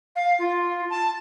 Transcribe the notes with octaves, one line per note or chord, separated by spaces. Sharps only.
F5
F4
A5